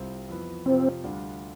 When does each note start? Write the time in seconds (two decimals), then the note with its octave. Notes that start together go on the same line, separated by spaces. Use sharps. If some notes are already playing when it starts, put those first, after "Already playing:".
Already playing: C2 C3 G3 C4 F4
0.29 F2 E3 B3
0.66 F2 C3 F3 C4
1.04 D2 D3 G3 D4 F4